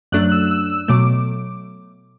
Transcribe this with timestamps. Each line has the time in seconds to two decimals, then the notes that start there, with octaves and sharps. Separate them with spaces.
0.12 F#2 F#3 A3 D4 F#6
0.32 E6
0.51 E6
0.70 E6
0.88 B2 F#3 A3 D6